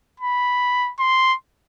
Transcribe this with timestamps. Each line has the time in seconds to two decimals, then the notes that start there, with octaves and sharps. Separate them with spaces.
0.20 B5
0.99 C6